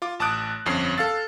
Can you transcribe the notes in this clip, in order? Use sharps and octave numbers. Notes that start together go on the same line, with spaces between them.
F4 D6
A1 A5 D6 D#6 F#6 D7
G1 F2 C#4 C7
A4 F5 E6 A6